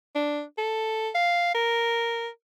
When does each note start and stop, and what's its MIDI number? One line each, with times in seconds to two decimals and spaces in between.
0.15 0.42 62
0.58 1.09 69
1.15 1.52 77
1.55 2.28 70